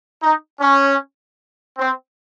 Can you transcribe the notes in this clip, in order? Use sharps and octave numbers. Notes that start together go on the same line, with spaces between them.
D#4
C#4
C4